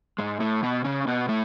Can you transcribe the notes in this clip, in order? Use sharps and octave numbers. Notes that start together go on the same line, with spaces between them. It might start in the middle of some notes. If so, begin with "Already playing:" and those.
G#2 G#3
A2 A3
B2 B3
C#3 C#4
B2 B3
A2 A3